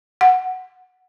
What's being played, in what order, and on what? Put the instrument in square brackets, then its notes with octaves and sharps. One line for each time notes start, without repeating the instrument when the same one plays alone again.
[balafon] F#5